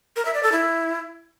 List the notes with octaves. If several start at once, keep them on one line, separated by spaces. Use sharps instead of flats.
A#4
E5
D5
A4
E4